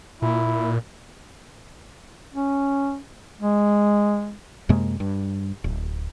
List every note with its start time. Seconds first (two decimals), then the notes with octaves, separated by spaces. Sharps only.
0.22 A#2 E4
2.34 C#4
3.41 G#3
4.69 F#2 C3 G#3 A#3
5.00 G2
5.64 D1